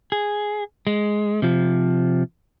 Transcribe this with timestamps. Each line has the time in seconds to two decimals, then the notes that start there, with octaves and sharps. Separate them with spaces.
0.12 G#4
0.87 G#3
1.42 C3 F3